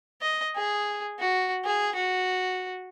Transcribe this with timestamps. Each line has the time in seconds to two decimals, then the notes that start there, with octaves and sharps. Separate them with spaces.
0.22 D#5
0.56 G#4
1.20 F#4
1.65 G#4
1.96 F#4